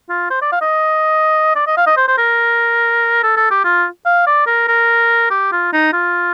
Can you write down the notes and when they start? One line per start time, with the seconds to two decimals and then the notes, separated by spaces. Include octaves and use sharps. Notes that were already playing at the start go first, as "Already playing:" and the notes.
0.09 F4
0.30 C5
0.42 D5
0.52 F5
0.61 D#5
1.56 D5
1.67 D#5
1.77 F5
1.86 D#5
1.97 C5
2.08 C5
2.18 A#4
3.23 A4
3.37 A4
3.51 G4
3.64 F4
4.06 F5
4.27 D5
4.47 A#4
4.68 A#4
5.30 G4
5.52 F4
5.73 D#4
5.93 F4